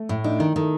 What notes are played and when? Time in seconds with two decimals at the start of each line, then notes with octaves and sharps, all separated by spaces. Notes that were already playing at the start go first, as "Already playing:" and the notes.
Already playing: A3
0.09 A2
0.24 D4 D#4
0.40 D#3
0.56 D#3 A4